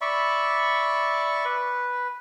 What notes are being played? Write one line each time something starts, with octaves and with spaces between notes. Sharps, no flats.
D5 E5 B5 C#6
B4